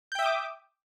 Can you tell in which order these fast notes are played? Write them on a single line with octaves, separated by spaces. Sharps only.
G6 G5 E5 D#6 D6